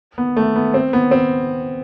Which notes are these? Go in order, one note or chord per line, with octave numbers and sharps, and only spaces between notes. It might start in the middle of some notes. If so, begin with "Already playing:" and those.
B3
A3
B3
C4
B3
C4